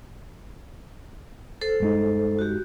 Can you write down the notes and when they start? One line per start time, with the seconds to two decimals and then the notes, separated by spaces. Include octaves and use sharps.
1.61 A4 C5
1.80 G2 G#3 D#4
2.39 F#4 G4